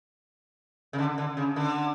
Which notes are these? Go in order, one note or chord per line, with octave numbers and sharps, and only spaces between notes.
C#3
D3
D3
C#3
D3